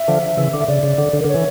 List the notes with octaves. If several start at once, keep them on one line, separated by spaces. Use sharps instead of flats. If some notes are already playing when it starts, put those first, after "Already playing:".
Already playing: E5
D3 F3
C#3 E3
D3
E5
C#3 D5
C#3
D3
D3
A#4
D3 C#5
E3